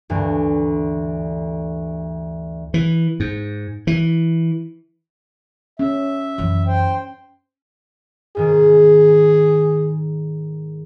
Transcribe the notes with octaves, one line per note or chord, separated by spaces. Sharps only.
D2 G2 E3
E3
G#2
E3
C#4 E5
F#2 E3
C5 G5
G#2 D#3 G#4